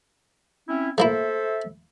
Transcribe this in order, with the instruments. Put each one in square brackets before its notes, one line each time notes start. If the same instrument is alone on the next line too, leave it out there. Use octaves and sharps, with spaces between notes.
[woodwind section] C4 C#4 E4
[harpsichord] A3 A#3 E4 [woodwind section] A4 C5 E5